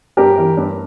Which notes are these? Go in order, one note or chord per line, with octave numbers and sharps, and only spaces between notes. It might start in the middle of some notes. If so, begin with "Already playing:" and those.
G2 G4 A#4
E3
G2